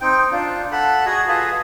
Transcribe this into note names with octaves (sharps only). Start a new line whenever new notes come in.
C4 D#4 G5
D4 F4
A4 F#5 B5
F#4 G#4 D#5
F4 G#4 A4 B4 D#5